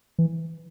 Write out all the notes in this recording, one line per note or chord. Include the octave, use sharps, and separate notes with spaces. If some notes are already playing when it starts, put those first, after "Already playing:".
E3